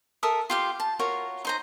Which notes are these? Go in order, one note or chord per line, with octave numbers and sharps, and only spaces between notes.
A4 A#4 E5 D#6
F4 G4 F5
A5
F4 F#4 A#4 C#5
D#4 C5 A#5